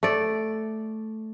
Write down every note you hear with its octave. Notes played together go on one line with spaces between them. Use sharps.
A3 D5